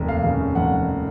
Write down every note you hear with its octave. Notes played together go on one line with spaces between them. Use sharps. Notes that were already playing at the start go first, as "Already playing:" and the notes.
Already playing: F1 D#2
F5
C#3
F1 F#5